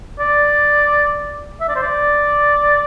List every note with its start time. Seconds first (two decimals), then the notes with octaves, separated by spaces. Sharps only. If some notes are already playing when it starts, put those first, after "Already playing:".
0.20 D5
1.61 E5
1.68 D5
1.76 C5
1.83 D5